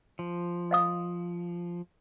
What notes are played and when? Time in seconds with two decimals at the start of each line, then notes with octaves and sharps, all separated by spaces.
0.19 F3
0.71 D#5 F5 D#6